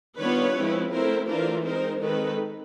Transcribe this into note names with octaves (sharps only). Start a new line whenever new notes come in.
D#3 G3 B3 D4 F4 B4 C#5
F3 G#3 C4 E4
A3 C4 E4 A#4 C5
E3 A3 D4 F4 A#4 C5
G#3 C4 D#4 A#4 C5
D#3 G#3 C4 D#4 A4 B4